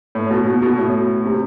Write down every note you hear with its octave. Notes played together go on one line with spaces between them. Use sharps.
A2
B2
B2
B2
A2
C3